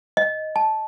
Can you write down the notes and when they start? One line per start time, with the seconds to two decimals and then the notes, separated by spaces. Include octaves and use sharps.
0.17 D#5
0.56 A5